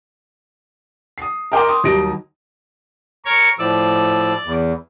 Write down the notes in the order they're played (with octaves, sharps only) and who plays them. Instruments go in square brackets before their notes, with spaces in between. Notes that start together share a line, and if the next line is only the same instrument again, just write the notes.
[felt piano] D#6 C7
A#4 D#5 G5 C6 D6
C6 D#6
D#2 F#3 G3 D#4 A#6 D7
[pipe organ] A#4 C#5 C#6
[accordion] A2 F3 E6 [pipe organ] D5
[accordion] E2